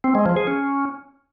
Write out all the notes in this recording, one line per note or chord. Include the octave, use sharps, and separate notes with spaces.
C4
G#3
F3
G#4
C#4